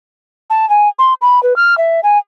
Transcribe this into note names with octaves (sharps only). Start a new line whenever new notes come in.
A5
G#5
C6
B5
B4
F6
E5
G#5